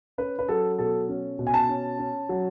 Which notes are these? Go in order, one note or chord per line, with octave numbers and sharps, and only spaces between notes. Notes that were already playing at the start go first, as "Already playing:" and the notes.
C#4 B4
B4
F#3 A4
B2 A4
C#4
B2
G#5
A5
C#4
C#4
F#3